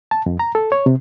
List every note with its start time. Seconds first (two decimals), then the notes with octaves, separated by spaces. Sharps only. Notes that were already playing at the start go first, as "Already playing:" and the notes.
0.11 A5
0.26 F2
0.39 A#5
0.55 A4
0.72 C#5
0.86 C3